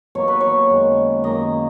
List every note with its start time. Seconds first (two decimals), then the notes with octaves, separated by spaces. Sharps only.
0.15 B2 F#3 A#3 C#5
0.28 B4
0.40 C#5
0.69 F#2 D#3 G#3
1.24 F#2 D#3 A#3 D#5